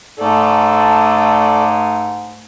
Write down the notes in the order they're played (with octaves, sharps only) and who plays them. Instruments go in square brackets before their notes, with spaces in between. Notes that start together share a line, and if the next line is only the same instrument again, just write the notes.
[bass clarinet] G#2 [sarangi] A3 [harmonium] A4 D5